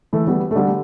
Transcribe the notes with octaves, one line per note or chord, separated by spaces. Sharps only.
E3 A3
G3 B3
A3
D3 G3